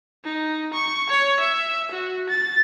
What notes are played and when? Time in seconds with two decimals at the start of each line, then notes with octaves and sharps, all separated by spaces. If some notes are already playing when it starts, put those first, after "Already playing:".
0.24 D#4
0.74 C#6
1.10 C#5
1.40 E5
1.92 F#4
2.29 A6